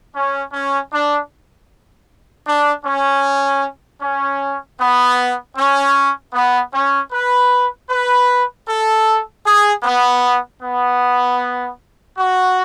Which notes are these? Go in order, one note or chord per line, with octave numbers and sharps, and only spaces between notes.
C#4
C#4
D4
D4
C#4
C#4
B3
C#4
B3
C#4
B4
B4
A4
G#4
B3
B3
F#4